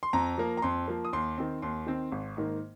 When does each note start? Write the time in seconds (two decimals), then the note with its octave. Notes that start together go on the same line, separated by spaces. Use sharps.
0.03 C6
0.13 F2 A#5
0.38 F3 A#3
0.57 A#5
0.62 F2 C6
0.88 F3 A#3
1.05 D#6
1.13 D#2 C6
1.38 D#3 C4
1.62 D#2 C6
1.87 D#3 C4
2.12 G#1
2.37 G#2 D#3 A#3